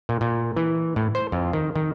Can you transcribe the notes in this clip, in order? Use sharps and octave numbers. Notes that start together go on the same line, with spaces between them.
A#2
A#2
E3
A2
C5
F2
D#3
D#3